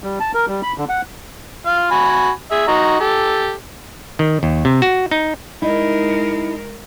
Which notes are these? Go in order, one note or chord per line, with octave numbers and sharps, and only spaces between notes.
G3
A5
A#4
G3
B5
D3
F#5
F4 F5
F#4 G#5 B5
G#4 E5
D#4 F#4 A#5
G4 A4
D#3
D#2
C3
F#4
D#4
G#3 D#4 E4 A#4